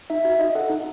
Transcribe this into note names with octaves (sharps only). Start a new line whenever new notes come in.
D#4 E5
F#4 E5
D#4 D#5
A4 F#5
D#4